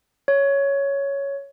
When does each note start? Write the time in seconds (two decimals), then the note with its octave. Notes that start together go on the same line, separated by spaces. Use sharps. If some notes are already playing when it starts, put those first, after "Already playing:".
0.28 C#5